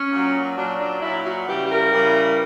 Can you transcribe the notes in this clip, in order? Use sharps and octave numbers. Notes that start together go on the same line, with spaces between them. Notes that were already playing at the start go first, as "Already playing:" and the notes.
Already playing: C#4
A#2 F#3
A#2 F#3 D4
D4
A#2 F#3 E4
F#4
C#3 E3 G3 G4
G4
A#4
C#3 E3 G3